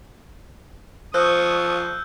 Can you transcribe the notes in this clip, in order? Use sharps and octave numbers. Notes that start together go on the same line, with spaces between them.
F3 C5 C#6 D#6 E6 F#6 G6